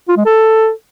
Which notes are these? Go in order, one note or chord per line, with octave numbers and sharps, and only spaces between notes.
F4
G#3
A4